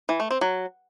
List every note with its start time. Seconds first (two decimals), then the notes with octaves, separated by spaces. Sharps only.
0.09 E3
0.20 A3
0.31 C4
0.41 F#3